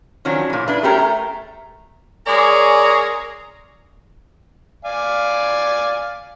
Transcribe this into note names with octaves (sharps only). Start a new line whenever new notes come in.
D#3 F3 F#3 C#4 D4
A#2 E3
D4 E4 B4
A3 B3 C#4 G4 G#4 A#4
A3 A#5
G#3 C#4 G#4 A#4 C#5 D5
D5 F5 G#5